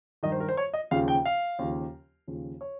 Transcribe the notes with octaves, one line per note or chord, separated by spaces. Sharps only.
G2 D#3 D#5
C5
A#4
C5
C#5
D#5
D#2 C#3 F3 F5
G5
F5
D#2 C#3 F3
D#2 C#3 F3
C#5